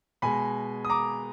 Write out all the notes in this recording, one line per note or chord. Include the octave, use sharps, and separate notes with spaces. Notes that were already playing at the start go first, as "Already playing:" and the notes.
B2 G#3 G#5 B5
D#6
A#5 D6